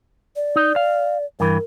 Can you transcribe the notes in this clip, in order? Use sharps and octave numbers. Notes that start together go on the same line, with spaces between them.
D5
D#4
F5
G2 E3 A#4